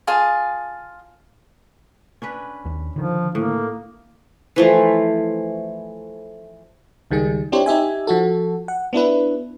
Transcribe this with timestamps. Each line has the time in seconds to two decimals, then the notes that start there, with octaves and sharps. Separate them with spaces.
0.07 F4 G#4 G#5 A5
2.22 C#4 D4 B4
2.65 D#2
2.96 D3 D#3 F3
3.35 A2 A#3
4.56 E3 F3 A3
7.11 C#2 D#3 G3 G#4
7.52 C4 D4 E4 G4 C5 C#5
7.66 D#4 G4 E5 G#5
8.07 F3 F#4 A4
8.68 F#5
8.93 B3 D4 E4 B4